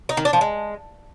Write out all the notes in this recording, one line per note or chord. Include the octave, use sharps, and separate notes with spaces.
D#4
D#3
D4
F3
G#3